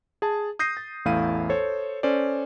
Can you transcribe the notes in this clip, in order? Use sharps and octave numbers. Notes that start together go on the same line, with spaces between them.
G#4 A5
D#6 G6 A#6 C7 D#7
A6
A1 E2 A3 E4 F5 D#7
A4 C5 C#5
C#4 A4 C5 D5